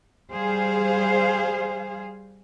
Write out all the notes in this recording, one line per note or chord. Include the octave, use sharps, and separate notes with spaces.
G3 G#4 C5 F5